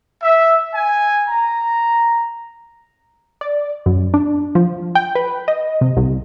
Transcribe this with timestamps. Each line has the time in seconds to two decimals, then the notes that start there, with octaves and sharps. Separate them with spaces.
0.22 E5
0.74 G#5
1.29 A#5
3.41 D5
3.86 F#2
4.14 D4
4.55 F3
4.95 G5
5.15 B4
5.48 D#5
5.81 C3
5.97 C2